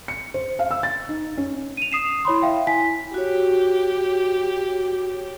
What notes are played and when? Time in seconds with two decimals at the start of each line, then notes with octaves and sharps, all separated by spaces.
0.08 C#7
0.34 C5
0.59 F5
0.71 E6
0.83 A6
1.08 D#4
1.37 C#4
1.77 D#7 F7
1.92 D#6 C7 E7
2.25 E4 C#5 B5 C6
2.42 E5 F5 G5
2.67 E4 G#5 B6
3.14 F#4 G4 C#5